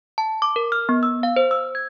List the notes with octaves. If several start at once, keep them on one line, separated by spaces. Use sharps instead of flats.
A5
D6
A#4
F6
B3
E6
F5
C5
E6
G#6